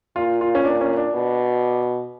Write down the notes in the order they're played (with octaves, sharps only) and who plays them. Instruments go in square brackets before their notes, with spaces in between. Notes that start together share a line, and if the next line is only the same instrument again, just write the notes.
[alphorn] A#2 [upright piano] F4
[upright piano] F4
C#4
[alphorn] A#2 [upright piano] D4
[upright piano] C#4
D4
[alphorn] B2